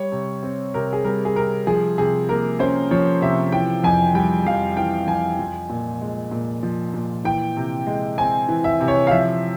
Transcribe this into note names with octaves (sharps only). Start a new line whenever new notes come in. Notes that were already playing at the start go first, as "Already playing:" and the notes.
Already playing: G3 C#5
C3
C4
C3 A#4
G#4
G3 A#4
G#4
C3 A#4
F3 G#4
C3 G#4
A#3 A#4
C#4 C5
F3 C#5
C3 E5
E3 G5
F2 G#5
G3 G5
F2 F5
E3 G5
F2 G#5
F3
A#2
G#3
A#2
F3
A#2
E3 G5
C3
G#3
C4 G#5
E3
E5
C3
C#5
F5
F3 E5